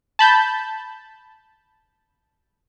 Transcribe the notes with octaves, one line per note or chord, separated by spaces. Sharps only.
A5 B5 G6